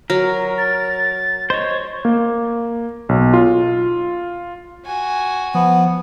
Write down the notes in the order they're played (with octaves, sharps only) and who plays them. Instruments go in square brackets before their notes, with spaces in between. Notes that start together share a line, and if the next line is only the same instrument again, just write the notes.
[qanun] F#3 [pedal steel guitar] A#4
[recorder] A6
[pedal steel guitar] C5 C#5 [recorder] D#5
[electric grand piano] A#3
B1
F4
[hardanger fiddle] F#4 G#5
[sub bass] F3 [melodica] B3